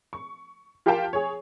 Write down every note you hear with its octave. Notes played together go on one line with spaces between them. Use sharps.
C#6
F4 G4 A#4 F5 G5 A5
G#4 C#5